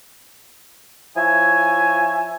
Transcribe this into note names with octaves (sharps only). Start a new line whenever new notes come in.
F3 E4 C#5 E5 G#5